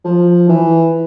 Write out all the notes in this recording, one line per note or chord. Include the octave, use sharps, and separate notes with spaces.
F3
E3